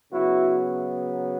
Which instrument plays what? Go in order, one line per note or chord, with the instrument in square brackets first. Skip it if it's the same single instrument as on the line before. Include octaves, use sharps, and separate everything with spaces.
[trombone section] C#3 F#3 B3 E4 F#4